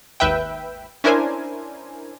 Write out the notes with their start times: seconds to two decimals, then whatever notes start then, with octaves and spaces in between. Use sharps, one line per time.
0.20 G#1 D#2 B4 E5 G5
1.04 C#4 D4 E4 A#4 C5 G#5